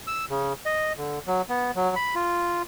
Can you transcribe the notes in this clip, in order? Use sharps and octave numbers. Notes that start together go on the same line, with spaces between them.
E6
C#3
D#5
D3
F#3
B3
F#3
B5
F4